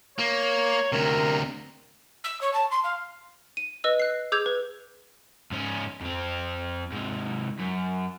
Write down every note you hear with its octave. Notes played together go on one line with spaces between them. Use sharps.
A#3 C#5
D2 C3 A#4
E6
C#5
A5
C6
F5
D#7
B4 D#5 E6
F#6 C7
G#4 D6 E6 G6 G#6 F7
B4
G#2 C#4
F2 C4
G#2 C3
F#2